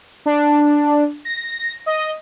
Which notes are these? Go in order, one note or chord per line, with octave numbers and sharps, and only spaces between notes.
D4
A#6
D#5